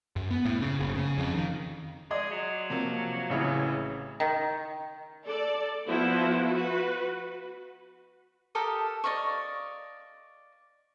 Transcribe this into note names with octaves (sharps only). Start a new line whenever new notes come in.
F#2
B3
A2
C#3
F#1
C#3
F2
D#3
G#3 D5 D#5
F#3
C3 F3 A#3
A1 C#3 E4
D#3
A4 D5
F3 B3 E4 F#4 B4
F#4 B4
G4 A4 A#4 D#6
D5 D#5 F5 C#6